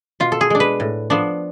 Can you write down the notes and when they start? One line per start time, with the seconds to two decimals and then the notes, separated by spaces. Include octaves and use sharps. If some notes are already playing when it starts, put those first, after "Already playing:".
0.20 B2 F4
0.32 A4
0.41 G#4
0.50 G#3 D4
0.60 B4
0.80 A2
1.10 F3 B3 D4